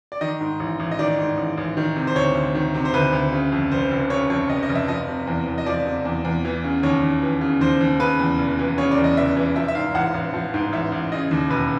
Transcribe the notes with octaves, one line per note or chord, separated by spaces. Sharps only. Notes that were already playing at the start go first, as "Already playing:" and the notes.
D5
D#3 D#5
G#2
A1
A1
D#5
D#3 D5
G#2
A1
A1
D#3
C3
C5
D2 C#5
D2
D#3
C3
C5
D2 B4
D2
C#3
F2
F1 C5
F1
C#3 C#5
F2 C#5
F1 D#5
D#5
F1
E5
F3 D#5
C3
E2
E2
D#5
F3 D5
C3
E2
E2
E3
C#3
D#2 C#5
D#2
E3
C#3
D#2 C5
D#2
C#3 B4
E2
F1
E3
C#3 C#5
D5
E2
D#5
F1 E5
E3
F3 E5
E5
G#2 F5
A1 F#5
A1
F3
G#2
A1 E5
A1
C#3 D#5
D#2
E1 B4